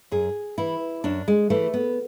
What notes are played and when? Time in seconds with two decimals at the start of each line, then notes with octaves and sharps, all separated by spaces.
0.11 F#2 G#4
0.58 E3 E4
1.04 F#2 D4
1.28 G#3
1.50 E3 A3
1.74 B3